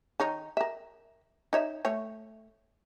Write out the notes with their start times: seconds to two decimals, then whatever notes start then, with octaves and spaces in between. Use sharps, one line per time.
0.20 D#3 D#4 C#5
0.57 A#4 E5
1.53 D#4 C#5 E5
1.85 A3 C#5